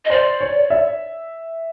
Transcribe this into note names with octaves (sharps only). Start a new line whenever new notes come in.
D#5
C5 D5
C#5
E5